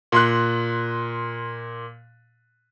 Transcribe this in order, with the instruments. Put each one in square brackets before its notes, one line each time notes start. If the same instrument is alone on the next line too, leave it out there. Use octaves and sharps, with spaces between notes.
[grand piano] A#2 C6 F#6